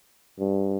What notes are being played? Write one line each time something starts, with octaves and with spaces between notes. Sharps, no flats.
G2